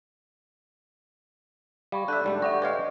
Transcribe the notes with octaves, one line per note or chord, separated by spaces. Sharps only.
G3 F5 B5 C#6
D3 D4 E5 F#6 G6
G#2 G3 A3
G4 E5 F#5 C#6
G4 B4 C#5 D#5 F5